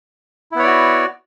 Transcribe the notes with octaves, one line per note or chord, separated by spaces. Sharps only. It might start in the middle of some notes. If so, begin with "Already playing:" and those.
B3 E4 F#4 C#5 D5